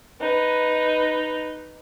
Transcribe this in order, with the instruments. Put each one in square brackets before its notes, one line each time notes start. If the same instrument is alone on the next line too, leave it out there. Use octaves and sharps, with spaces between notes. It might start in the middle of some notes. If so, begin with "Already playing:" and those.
[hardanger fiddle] D#4 B4